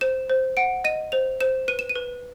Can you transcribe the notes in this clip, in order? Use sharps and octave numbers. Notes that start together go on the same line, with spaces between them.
C5 E7
C5
F#5 D7
D#5 D#7
C5 F7
C5 E7
B4 D#7
E7
D#7
B4